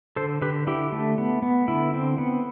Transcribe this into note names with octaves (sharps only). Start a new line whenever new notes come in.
D3 A4 C5
D3 G4 B4
D3 E4 G4
A3
B3
B3
D3 E4
C4
B3